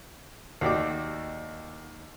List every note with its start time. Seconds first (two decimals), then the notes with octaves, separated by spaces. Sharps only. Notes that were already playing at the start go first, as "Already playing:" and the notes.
0.61 D#2 F#4 G4 D5 G5 D6